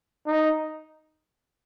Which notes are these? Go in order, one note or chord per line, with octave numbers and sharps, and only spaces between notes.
D#4